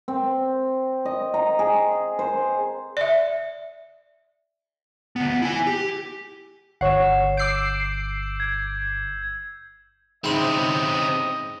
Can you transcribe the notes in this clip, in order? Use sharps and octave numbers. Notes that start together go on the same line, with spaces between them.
C4
D#5
A#5
G#4
C5
D5 E5
D2 B3
E4 G#5
G4
G1 C#5 F#5 C7 E7
D6 E6 G6 C7 D7
G#6
G#2 C#3 C4 E4 D#5 C6